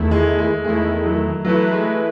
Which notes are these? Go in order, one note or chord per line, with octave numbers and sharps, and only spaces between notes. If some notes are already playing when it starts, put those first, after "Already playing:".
Already playing: E2 D#3 A3 E4
G#3
G#3
E2 D#3 G#3 A3 E4
F#3
E3 F#3 A3 E4 B4
G#3